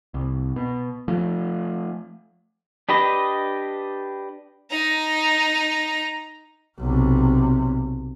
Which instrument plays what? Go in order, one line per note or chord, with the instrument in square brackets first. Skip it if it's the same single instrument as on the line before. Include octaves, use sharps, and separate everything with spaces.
[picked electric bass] C2
B2
F3 A3
[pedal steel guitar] D4 G4 B4 D#5
[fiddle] D#4 A#5
[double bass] B1 C3